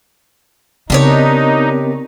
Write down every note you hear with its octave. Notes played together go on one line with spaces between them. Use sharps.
C#3 B3 C4 D4 D#4 G4 A#4 C#5